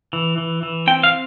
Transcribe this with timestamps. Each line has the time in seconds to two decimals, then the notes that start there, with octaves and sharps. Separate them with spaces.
0.13 E3
0.38 E3
0.63 E3
0.87 C4 G5
1.04 F5